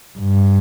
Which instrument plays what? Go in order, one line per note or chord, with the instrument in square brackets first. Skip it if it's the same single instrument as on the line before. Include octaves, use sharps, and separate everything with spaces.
[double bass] G2